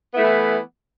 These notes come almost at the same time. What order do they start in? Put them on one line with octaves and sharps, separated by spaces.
B3 E4 A3 E3